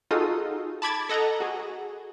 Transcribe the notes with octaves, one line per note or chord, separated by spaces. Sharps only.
D#4 F4 F#4 G#4 A4 D#6
A5 B5 D6 G#6 A6
A4 D#5 F#5 A5 A#5
F#4 G#4